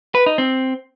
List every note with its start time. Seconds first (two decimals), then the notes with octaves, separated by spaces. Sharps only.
0.15 B4
0.26 D#4
0.38 C4